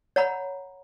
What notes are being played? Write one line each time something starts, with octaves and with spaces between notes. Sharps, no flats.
C#5 F#5 A#5 B5